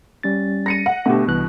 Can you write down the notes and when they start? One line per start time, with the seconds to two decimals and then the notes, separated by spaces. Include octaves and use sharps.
0.23 G3 C#4 A6
0.66 A#6 C#7 D#7
0.86 F#5
1.06 B2 D3 A3 B3 G4
1.28 C2 E3 F#6